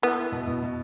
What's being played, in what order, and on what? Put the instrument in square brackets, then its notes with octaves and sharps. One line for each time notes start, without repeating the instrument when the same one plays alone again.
[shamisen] B3 [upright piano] E4
[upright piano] E4
B2
B2
B2